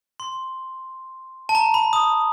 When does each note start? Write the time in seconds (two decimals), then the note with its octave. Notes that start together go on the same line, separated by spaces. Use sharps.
0.20 C6
1.49 A5
1.55 A#5
1.74 B5
1.93 D#6